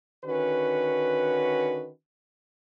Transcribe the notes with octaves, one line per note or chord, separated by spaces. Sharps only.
D3 D#3 C#4 F#4 B4